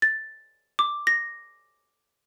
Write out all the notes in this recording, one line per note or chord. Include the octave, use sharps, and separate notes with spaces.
A6
D6
A#6